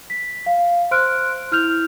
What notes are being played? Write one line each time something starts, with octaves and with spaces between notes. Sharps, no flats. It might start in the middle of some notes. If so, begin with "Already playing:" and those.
B6
F5
C5 C6 F6 F#6 D7
E4 F6 G6 F7